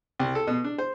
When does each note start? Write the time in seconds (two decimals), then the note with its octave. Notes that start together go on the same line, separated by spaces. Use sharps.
0.19 C2
0.35 A4
0.47 B2
0.64 D4
0.78 C5